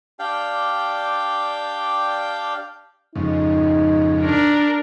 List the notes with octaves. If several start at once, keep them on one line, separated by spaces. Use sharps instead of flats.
D4 G4 D5 F5 G5
F2 G#2 C#3 D#4
D4 A#4